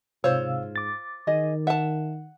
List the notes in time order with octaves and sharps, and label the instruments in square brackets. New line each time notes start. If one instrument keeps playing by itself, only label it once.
[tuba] G#2 [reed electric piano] C3 F5 E6 [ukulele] F4 [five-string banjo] C5 C#5
[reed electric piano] D6 A6
[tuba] D#3 [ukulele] G#4 D#5
[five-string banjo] E5 A5 [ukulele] F#5